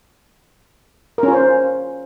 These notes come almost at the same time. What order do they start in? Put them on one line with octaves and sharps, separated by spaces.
A#4 C#4 F4 C5